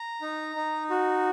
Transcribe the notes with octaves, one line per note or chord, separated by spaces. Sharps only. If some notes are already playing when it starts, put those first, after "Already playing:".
Already playing: A#5
D#4
D#4
F#4